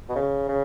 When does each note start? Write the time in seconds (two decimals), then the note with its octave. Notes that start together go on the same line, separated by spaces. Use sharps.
0.09 B2
0.16 C#3
0.49 C#3